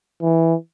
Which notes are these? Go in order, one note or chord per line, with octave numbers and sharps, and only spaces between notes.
E3